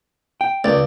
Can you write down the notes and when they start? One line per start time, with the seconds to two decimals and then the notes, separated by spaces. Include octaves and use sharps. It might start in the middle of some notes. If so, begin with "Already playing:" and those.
0.41 G5
0.64 C#2 D5